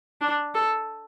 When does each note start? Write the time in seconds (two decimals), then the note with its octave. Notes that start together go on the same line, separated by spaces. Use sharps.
0.21 D4
0.55 A4